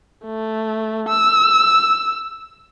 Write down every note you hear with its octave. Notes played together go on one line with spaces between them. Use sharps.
A3
E6